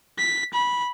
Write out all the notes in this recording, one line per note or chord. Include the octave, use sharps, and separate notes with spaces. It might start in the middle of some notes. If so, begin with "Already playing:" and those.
B6
B5